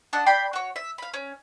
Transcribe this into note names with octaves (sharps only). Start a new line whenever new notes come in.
D4 D#5 F#5 A5
D5 G5 B5 C6
F#4 C#5
E5
F5 B5
C#4